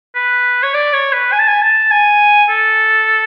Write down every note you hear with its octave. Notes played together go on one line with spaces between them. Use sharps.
B4
C#5
D5
C#5
B4
G#5
A5
G#5
A5
G#5
A4